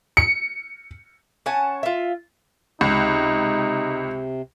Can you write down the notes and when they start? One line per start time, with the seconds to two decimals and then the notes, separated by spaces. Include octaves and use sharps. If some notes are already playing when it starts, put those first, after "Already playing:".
0.17 C#7
1.46 C#4 F#5 G#5 A5
1.83 F4 E5
2.81 C#2 C3 D#4